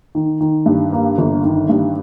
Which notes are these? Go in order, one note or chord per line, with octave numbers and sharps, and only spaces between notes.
D#3
D#3
G2
A#3
G1
D#3
G2